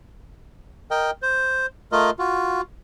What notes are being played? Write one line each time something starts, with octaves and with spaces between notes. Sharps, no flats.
A#4 D#5 G5
C5
A3 F4 A#4 D#5
F4 F#4